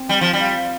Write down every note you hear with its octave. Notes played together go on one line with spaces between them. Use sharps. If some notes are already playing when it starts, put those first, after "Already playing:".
Already playing: C4
G3
F3
G3
F4